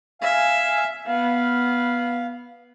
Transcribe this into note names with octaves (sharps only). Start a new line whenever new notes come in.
E5 F5 G#5
B3 F5